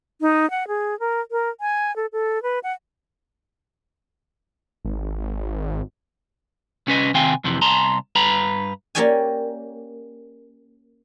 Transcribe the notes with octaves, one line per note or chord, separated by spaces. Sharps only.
D#4
F#5
G#4
A#4
A#4
G#5
A4
A4
B4
F#5
G#1
C2 C#4 B4 D#5
C3 D#3 C4 F5 G5 G#5
F2 C3 E3
C2 A5 A#5 C6
G2 B4 A#5 B5
A#3 C#4 G4 D5 G5 G#5